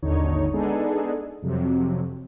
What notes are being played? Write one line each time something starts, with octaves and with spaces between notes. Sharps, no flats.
G#1 D#2 D3 D#4 C#5
G#3 B3 D4 D#4 G#4 A4
F2 C3 F#3